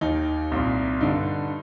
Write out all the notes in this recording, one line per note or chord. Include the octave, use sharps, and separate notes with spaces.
D#2 D#3 D#4
C2 A#2
G2 D3 D#4